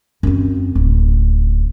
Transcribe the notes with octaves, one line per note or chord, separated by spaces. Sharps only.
F#2 C4
D1